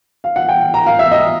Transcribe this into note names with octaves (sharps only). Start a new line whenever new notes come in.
F5
F#5
G5
A#5
F5
E5
D#5